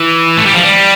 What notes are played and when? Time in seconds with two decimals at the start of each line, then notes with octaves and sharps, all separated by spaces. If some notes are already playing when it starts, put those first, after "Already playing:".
Already playing: E3
0.37 A3
0.46 G3
0.54 F3
0.63 G3